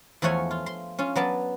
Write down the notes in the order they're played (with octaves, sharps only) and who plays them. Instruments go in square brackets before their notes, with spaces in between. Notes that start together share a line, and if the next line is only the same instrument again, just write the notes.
[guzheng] E2 F3 A3 C#5 F#5 G#5
F4
C6
C#4 F4
F#3 B3 D5 A5